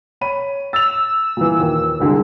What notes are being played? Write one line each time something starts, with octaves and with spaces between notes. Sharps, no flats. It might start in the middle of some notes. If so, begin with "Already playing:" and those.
C#5 B5 D#7
E6 A6 F7
A#2 E3
D#2
C2 D3 G#3